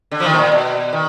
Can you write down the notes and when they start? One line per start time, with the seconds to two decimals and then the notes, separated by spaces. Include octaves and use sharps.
0.11 D3
0.20 F3
0.25 D#3
0.33 B2
0.38 A#2
0.52 B2
0.93 D#3